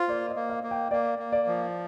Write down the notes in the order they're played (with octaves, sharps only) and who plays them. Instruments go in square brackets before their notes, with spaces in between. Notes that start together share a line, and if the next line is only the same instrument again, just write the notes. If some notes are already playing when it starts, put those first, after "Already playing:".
Already playing: [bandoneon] F4 [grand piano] C5
[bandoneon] A#3 [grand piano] D5
[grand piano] D#5
[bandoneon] A#3
[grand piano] F5
[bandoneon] A#3
[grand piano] G5
[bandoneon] A#3 [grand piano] D5
[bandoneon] A#3
[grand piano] D5
[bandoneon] F3